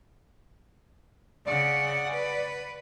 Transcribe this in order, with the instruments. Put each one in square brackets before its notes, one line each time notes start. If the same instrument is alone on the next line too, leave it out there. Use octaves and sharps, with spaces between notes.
[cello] C#3 F#5 [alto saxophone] D5
[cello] B4